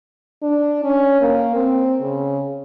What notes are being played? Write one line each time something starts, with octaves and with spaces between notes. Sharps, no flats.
D4
C#4
A#3
C4
C#3